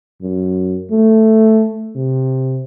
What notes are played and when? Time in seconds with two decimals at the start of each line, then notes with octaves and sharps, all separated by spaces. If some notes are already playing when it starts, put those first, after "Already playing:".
0.22 F#2
0.91 A3
1.96 C3